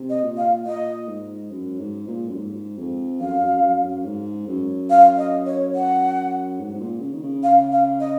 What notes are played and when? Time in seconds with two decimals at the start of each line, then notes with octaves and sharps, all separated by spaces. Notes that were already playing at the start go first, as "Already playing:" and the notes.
Already playing: C3
0.10 D#5
0.23 A#2
0.37 F5
0.66 A#2 D#5
1.08 G#2
1.51 F#2
1.79 G#2
2.07 A#2
2.29 F#2
2.36 G#2
2.78 F2
3.20 F#2 F5
3.41 F#2
3.62 F#2
3.83 F#2
4.05 G#2
4.47 F#2
4.90 F5
5.17 D#5
5.46 C#5
5.75 F#5
6.60 G#2
6.74 G#2
6.80 A#2
7.01 C#3
7.13 D#3
7.22 C#3
7.43 F5
7.72 F5
8.00 D#5